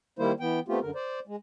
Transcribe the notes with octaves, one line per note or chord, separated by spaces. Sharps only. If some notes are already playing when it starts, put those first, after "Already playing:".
D#3 G3 A#3 E4 C5
E3 B3 G5
A3 B3 C4 F4 G4
F#2 D3 A#4
C5 D5
G#3